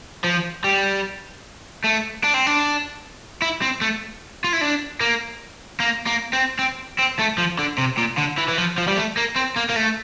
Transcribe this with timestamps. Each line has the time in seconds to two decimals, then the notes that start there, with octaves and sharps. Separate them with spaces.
0.25 F3
0.64 G3
1.84 A3
2.23 D4
2.34 C4
2.46 D4
3.42 E4
3.62 C4
3.81 A3
4.44 F4
4.53 E4
4.61 D4
5.01 A#3
5.80 A#3
6.07 A#3
6.33 C4
6.59 C4
6.98 C4
7.19 A3
7.38 F3
7.59 D3
7.78 C3
7.97 A#2
8.17 D3
8.38 E3
8.48 E3
8.58 F3
8.78 F3
8.88 G3
8.97 A3
9.17 A#3
9.36 C4
9.57 A#3
9.70 A#3
9.77 A3